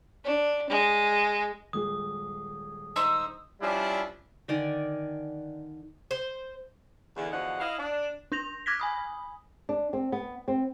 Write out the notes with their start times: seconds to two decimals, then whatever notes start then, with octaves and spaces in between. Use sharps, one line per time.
0.24 D4
0.69 G#3
1.73 D#1 G#3 G#4 D#6
2.96 D#4 C5 E6
3.61 F3 G3 C#4 D4 E4
4.48 D3 D#3 D5 G#5
6.11 C5
7.17 E2 D3 E3
7.32 E2 D3 F3 F#4 D#5 F#5
7.60 E4 D#5 F5
7.78 D4
8.32 D4 G6 A#6 F7
8.66 D6 F6 F#6 G#6 A#6 B6
8.80 G#5 B5 D#6
9.69 D4
9.93 C4
10.12 B3
10.48 C4